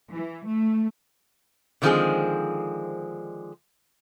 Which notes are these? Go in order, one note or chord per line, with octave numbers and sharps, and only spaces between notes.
E3
A3
D3 D#3 F3 G#3 C4 G#4